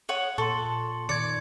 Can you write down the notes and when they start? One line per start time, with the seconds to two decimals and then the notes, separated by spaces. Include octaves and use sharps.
0.09 C#5 F#5 D#6
0.38 A#2 A4 C6 C#6
1.09 A#2 D#3 D5 G#6 C#7